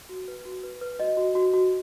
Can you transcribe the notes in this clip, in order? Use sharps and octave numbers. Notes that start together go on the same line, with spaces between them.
F#4
B4
F#4
B4
B4
F#4 D#5
F#4
F#4
F#4